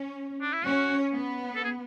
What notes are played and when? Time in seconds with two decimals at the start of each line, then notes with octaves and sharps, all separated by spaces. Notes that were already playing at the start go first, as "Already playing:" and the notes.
Already playing: C#4
0.41 D4
0.53 E4
0.64 C#4 F#4
1.14 B3
1.55 A4
1.64 G#4